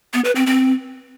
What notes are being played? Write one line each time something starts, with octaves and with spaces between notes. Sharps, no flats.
B3
B4
C4
C4